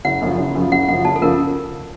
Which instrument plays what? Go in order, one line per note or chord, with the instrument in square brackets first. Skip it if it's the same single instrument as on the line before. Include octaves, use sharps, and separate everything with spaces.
[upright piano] F#1 [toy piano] F#5
[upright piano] F#2 C#3 F3
F#1
F#2 C#3 F3
[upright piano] F#1 [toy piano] F#5
[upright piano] F#2 C#3 F3 [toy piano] F#5
[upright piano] F#1 [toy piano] A5
[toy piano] A4
[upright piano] C#3 F3 [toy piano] A#4